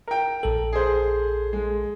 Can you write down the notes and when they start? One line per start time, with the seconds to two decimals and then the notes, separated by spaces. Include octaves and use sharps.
0.08 A#4 G5
0.43 A#1 A4
0.73 G#4 C5
1.53 G#3